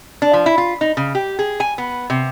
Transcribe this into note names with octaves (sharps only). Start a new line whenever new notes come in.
D4
F3
E4
F4
D#4
C#3
G4
G#4
G#5
B3
C3